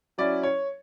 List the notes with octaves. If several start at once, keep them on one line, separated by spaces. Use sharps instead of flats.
F#3 C#4 E4 D5
C#5